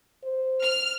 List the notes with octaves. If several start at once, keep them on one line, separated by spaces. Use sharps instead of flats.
C5
F6